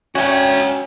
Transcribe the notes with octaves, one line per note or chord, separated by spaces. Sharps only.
C#4 F#4 C#5 E5 G5 G#5